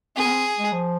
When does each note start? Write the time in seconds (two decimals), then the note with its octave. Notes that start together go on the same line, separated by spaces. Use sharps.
0.16 C4 G#4
0.26 B3
0.31 C4
0.58 G#3
0.72 F3